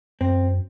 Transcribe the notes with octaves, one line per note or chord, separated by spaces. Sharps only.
F#2 C4